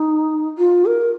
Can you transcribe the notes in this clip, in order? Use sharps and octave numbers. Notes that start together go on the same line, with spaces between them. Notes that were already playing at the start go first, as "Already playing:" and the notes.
Already playing: D#4
F4
A#4